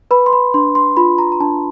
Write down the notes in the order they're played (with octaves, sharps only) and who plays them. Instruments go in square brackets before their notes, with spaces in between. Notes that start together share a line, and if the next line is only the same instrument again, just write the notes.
[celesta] B4 B5
C6
B5
D4 C6
C6
F4 B5
A#5
A#5
D4 A5